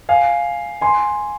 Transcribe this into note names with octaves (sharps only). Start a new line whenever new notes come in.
F5 G#5
G#5 C6